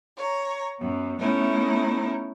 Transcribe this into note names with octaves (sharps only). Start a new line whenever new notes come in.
C#5 A#5
F#2 B3
A3 B3 C#4 D#4 E4 A#4